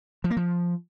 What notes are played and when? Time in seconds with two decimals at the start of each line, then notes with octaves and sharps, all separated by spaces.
0.24 F3
0.31 A#3
0.37 F3